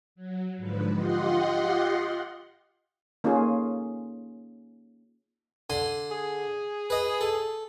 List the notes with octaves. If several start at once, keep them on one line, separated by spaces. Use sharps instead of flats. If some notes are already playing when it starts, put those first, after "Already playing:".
F#3
G#2 D3 F3 B4
F4 G4 D#5 F#5 C6
A#3 C#4 D#4 F4 G#4 A4
D3 G#5 C6
G#4
B4 D#5
A4